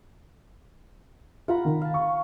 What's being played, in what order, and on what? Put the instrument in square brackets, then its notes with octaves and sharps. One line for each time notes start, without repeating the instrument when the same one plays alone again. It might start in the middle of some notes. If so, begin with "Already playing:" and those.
[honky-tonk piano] F4 [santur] F#5 A#5 B5
[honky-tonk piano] D#3
[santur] F5 A5
[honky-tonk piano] C#6